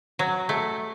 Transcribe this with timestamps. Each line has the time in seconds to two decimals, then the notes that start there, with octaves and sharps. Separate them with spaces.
0.19 F#3
0.49 A3